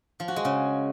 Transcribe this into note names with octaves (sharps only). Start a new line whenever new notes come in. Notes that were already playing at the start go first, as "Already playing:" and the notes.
F3
F#4
G#3
C#3